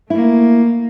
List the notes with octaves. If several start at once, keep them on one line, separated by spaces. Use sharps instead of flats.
A3 A#3 E4